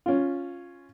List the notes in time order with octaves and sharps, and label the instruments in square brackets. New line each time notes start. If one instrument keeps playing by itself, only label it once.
[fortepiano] C#4 F4